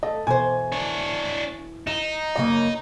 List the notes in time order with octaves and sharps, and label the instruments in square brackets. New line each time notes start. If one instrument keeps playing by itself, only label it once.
[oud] A3 [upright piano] D#5
[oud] B2 E3 C5 [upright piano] G#5
[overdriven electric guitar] D4 C#5
[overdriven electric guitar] D#4 [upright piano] E7
[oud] F#2 C#3 A#3 [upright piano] D#5